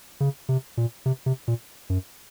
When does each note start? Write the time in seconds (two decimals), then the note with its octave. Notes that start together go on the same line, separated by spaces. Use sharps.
0.20 C#3
0.49 C3
0.77 A#2
1.06 C3
1.26 C3
1.48 A#2
1.90 F#2